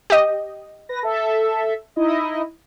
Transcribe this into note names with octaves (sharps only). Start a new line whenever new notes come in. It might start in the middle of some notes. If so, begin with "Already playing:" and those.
G4 D#5
B4 A#6
A4 E5
D#4 E4 D#5